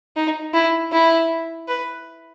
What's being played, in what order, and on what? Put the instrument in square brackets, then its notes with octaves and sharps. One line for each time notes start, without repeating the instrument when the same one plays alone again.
[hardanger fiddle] D#4
E4
E4
B4